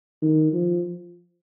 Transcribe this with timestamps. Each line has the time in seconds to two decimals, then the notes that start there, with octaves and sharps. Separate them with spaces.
0.22 D#3
0.53 F3